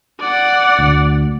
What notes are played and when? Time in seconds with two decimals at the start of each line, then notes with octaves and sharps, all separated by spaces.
0.20 D5 F#5
0.79 D2